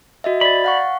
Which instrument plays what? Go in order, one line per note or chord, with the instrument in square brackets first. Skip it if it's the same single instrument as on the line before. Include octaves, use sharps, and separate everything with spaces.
[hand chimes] F#4 D#5 E5
[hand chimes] D5 A6 [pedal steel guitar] B5
[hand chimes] F5 F#5 C#6